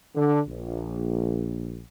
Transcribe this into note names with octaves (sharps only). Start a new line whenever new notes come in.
D3
A#1